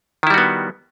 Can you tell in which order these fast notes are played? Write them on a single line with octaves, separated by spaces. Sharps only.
D#3 E4 G3 F#4 B3